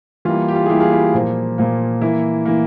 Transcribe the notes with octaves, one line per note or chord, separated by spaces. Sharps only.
E3 G3 A#3 F4
G4
F4
G#4
E3 G3 A#3 E4 G4
F4 G#4
E4 G4
A#2 F3 A#3
A#2 F3 A#3
E3 A#3 E4
E3 A#3